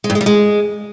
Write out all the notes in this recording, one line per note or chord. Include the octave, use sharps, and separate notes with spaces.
G#3
G2
G#3
G3
G#3